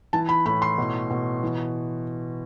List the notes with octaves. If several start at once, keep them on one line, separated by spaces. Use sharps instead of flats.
E3 A5
B5
A2 B5
C6
B2
B2
E3